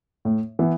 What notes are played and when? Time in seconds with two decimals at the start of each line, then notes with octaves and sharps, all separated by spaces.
0.25 A2
0.59 E3 B3